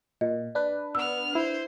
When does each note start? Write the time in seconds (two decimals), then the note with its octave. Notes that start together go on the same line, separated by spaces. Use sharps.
0.21 A#2 D#5
0.55 D4 B4
0.95 B3 E6 F6
1.35 E4 C5